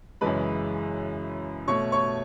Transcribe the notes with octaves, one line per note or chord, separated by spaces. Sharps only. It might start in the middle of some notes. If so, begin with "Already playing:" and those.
F#2 C#3 E3 G#3 B4 B5
B2 A3 C#5 C#6
C#5 C#6